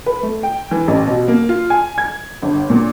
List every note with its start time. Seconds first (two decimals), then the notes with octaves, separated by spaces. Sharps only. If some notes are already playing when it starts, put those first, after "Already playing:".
0.06 B4
0.23 A3
0.43 G5
0.71 E3
0.88 A1
1.07 B2
1.28 A#3
1.49 F4
1.70 G#5
1.98 G#6
2.42 G1
2.70 A#2